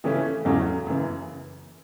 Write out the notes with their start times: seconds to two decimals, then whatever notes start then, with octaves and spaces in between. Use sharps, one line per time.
0.04 C#3 E3 A3 C#4
0.45 E2 C#3 F#3 A3
0.86 F#2 C#3 E3